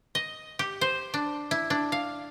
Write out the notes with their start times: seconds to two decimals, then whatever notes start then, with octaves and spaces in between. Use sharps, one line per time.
0.15 D#5
0.59 G4
0.81 C5
1.14 D4
1.51 E4
1.70 D4
1.92 F5